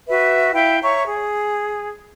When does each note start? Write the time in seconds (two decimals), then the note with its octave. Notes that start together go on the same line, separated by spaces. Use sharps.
0.08 F#4 B4 E5
0.53 E4 E5 F5 G5
0.82 C#5 E5 A#5 C#6
1.07 G#4